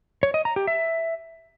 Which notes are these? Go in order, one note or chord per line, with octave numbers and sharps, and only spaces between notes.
C#5
D#5
A#5
G4
E5